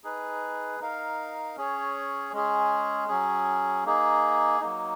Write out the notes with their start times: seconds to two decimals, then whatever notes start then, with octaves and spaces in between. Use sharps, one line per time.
0.04 D#4 G#4 B4
0.80 D#4 A#4 F5
1.57 C#4 G#4 C#5
2.33 G#3 C#4 G#4
3.08 F#3 C#4 G#4
3.85 A#3 D#4 G#4
4.60 F#3 A#3 D#4